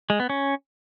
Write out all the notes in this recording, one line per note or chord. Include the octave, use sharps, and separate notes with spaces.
G#3
B3
C#4